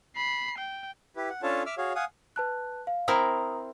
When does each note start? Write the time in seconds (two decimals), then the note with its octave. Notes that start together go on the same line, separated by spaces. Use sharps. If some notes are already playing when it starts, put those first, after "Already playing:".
0.17 B5 C7
0.58 G5
1.16 E4 G4 B4
1.30 F#5
1.43 C#4 D4 F4 A4 C#5 A5
1.66 E5 D6 E6 F6
1.78 F#4 G#4 C#5 F5
1.95 F5 F#5 G#5 D#6
2.36 B4 A5 F#6
2.87 F5
3.08 C4 E4 A#4 A#5 D#6